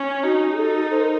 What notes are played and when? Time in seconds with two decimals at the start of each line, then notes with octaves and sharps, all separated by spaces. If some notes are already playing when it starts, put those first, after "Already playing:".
Already playing: C#4
0.23 D#4 F#4
0.56 A4
0.91 C5
1.00 A#4